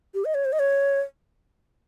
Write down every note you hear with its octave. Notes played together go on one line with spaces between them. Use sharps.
G4
D#5
C#5
C5
D#5
C#5